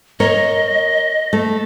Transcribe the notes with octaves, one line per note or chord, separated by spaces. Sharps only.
A#4 C#5 D#5
A3